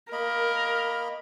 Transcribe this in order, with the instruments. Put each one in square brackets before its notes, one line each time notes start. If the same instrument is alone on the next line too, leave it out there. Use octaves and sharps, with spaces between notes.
[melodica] A#3 D#5 B5 [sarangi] A#4